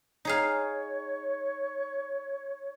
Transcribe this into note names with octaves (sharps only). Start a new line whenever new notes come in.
D#4 G#4 C#5 F5